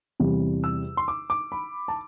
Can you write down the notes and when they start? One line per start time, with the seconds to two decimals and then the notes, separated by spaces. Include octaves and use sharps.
0.20 E2 C3 G3
0.64 E6
0.97 C6
1.08 D6
1.30 D6
1.52 B5
1.88 A5